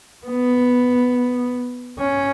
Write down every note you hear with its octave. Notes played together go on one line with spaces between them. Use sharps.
B3
C#4